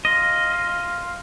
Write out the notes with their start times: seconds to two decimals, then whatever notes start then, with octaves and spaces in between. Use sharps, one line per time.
0.05 F4 D#5